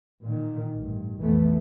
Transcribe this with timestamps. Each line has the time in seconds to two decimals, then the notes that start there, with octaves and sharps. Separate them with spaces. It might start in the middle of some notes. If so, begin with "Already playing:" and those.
0.24 A#2 D#3
0.75 A1 G2
1.19 B1 F2 E3 A3 B3